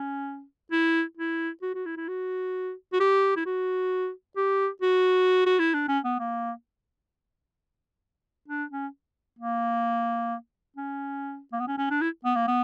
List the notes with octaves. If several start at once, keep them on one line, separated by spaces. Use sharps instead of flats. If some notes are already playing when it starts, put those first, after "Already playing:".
Already playing: C#4
E4
E4
F#4
F#4
E4
E4
F#4
F#4
G4
E4
F#4
G4
F#4
F#4
E4
D4
C#4
B3
A#3
D4
C#4
A#3
C#4
A#3
B3
C#4
C#4
D4
E4
B3
A#3
B3